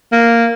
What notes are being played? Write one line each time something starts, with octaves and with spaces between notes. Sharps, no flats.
A#3